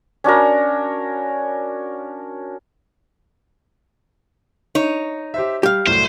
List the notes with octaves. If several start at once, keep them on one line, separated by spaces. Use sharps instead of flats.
C#4 D4 F#4 A#4
D#4 C#5
G4 C5 E5
G3 G4 F5
C2 A2 F#3 C5